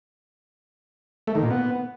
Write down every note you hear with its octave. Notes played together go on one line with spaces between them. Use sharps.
A3
D#3
A#2
B3